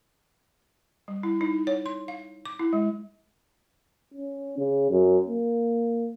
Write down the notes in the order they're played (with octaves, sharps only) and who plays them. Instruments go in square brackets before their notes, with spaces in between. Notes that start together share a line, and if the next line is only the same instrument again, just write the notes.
[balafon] G3
E4
D#4
C#5
C6
F5
D6
E4
G#3
[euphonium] C#4
C#3
F#2
A#3